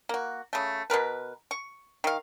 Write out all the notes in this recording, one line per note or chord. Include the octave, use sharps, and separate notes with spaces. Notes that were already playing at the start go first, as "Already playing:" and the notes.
A#3 F#4
C#3 A3
B2 B3 A#4 B4
C#6
D#3 F5